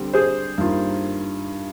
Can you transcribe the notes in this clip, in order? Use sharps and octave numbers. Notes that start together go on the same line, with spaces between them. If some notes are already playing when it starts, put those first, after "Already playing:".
Already playing: D3 G3 C4 G4
G#4 C5
G2 D#3 A#3 F4